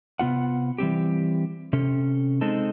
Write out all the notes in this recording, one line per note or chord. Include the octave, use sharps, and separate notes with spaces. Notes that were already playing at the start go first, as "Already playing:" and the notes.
C3 B3 F4 F#5
E3 G3 C4 G4
C3 C#4 A4
G#3 C4 D#4 A4